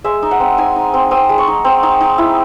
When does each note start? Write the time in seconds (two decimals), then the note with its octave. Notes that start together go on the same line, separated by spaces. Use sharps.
0.04 G#3 E5
0.23 D#4
0.31 F#5
0.40 C4
0.58 D#4 G#5
0.76 D#4
0.94 C4
1.11 C4 D#6
1.29 G#3
1.38 C#6
1.47 D#4
1.65 C4
1.83 D#4
2.01 D#4
2.18 E4